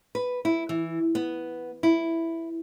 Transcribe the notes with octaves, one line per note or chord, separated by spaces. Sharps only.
B4
E4
E3
B3
E4